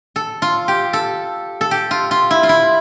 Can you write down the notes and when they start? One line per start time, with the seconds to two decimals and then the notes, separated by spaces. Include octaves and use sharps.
0.16 A4
0.42 F4
0.68 G4
0.93 A4
1.61 A4
1.71 G4
1.91 F4
2.11 F4
2.31 E4
2.43 F4
2.49 E4